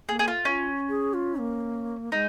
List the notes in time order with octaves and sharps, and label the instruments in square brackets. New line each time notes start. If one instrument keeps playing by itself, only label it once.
[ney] A#3 [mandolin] G#4
[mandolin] G#4
F4
[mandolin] C#4 [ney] F4
[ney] G#4
F4
A#3
[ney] G#3 [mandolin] D#4